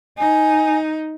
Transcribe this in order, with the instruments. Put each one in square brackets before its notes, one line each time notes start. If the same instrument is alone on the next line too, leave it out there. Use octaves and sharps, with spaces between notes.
[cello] D#4 [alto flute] G#5